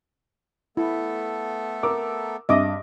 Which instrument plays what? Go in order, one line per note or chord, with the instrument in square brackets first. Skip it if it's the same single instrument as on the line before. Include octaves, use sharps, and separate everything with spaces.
[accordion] A3 B3 A4 [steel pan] E4
[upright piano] A#4 D6 E6
[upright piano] G2 E5 D6 [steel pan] D#5